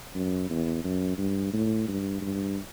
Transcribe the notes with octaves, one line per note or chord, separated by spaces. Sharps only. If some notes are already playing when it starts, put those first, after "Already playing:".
F#2
E2
F#2
G2
A2
G2
G2